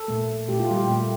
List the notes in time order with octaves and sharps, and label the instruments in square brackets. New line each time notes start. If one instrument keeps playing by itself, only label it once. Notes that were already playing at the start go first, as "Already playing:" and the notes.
Already playing: [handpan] A4
A#2 A3
A#2 A3 G4
F4
G3 G4
A#2 A3